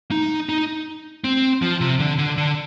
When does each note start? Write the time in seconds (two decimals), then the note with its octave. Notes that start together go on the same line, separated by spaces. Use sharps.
0.11 D#4
0.49 D#4
1.24 C4
1.62 F3
1.81 C3
2.00 D3
2.18 D3
2.37 D3